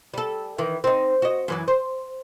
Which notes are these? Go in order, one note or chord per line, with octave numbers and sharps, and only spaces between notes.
G3 A4
D#3 E3
C4 D#4
F#4 D#5
F#2 E3 F#3
C5